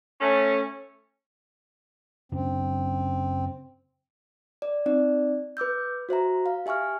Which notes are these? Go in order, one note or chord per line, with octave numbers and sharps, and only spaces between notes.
A3 C#4
F#2 C#3 C4 D4
D5
C4 D#4 D5
B4 D6 E6 G6
F#4 C5 E5 A#5
F5
G4 E5 G#5 C#6 F6